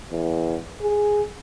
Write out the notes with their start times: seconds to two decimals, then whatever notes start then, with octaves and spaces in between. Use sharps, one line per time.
0.11 E2
0.81 G#4